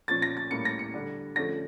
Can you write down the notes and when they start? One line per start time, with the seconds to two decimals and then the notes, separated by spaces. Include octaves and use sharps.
0.08 A#2 F3 C#4 A6
0.22 A#6
0.37 A6
0.51 A2 G3 A#3 C#4 C#7
0.65 A#6
0.79 C#7
0.94 D3 G3 D4
1.36 D3 F3 A3 C#4 A#6